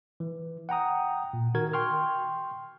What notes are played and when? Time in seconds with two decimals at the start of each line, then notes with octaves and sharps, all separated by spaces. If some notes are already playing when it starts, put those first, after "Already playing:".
0.20 E3
0.69 F#5 G5 A#5 D#6
1.33 A#2
1.54 D#3 F#4 A#4 G#6
1.73 G5 C6 C#6 F6